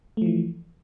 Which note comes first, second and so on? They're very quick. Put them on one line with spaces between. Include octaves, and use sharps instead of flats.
A3 F3 E3